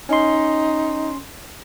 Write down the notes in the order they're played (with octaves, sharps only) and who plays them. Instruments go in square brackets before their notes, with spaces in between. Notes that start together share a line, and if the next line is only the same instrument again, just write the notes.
[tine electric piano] C#4 C6 [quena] D#4